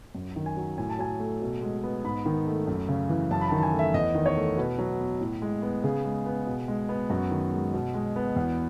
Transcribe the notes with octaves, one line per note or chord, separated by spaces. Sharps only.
F#2
D#3
G#5
F#3
A2 G#5
A5
F#3 G#5
A3
B2
G#3
B3
G#2 B5
D#3
A3
F#2
C#3
E3
F#2 A5
B5
A5
D#3
A5
G#5
A3
E5
E2 D#5
D#3
C#5
A3
B2 B4
F#3
B3
A2
G#3
B3
C#3 G#4
G#3
B3
B2
G#3
B3
F#2 F#4
D#3
G#3
B2
G#3
B3
E2